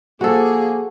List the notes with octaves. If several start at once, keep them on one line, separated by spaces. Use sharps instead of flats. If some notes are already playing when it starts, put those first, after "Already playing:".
F3 A#3 F#4 G#4 A4